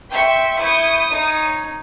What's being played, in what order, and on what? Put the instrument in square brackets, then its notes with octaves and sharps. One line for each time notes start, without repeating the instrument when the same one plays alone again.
[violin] E5 [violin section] G5 C6 C#6
[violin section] E4 C#6 G6 [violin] D#6
[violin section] D#4 C#5